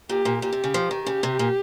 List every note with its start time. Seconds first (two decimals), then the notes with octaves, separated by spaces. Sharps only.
0.09 A#2 G4
0.25 A#2
0.42 A#2 G4
0.52 C3
0.64 C#3
0.74 F3
0.91 D#3
1.06 C#3 G4
1.23 C3
1.39 A#2